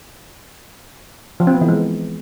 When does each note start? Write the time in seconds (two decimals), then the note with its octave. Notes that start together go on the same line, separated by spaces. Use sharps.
1.40 F3
1.47 C4
1.54 B3
1.61 E3
1.68 G#3